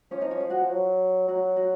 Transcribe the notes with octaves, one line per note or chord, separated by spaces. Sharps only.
F3 C#4 C#5
D#4 D#5
C#4 C#5
G#4
F#4 F#5
F3
F#3
F#3 F#4 F#5
F#4 F#5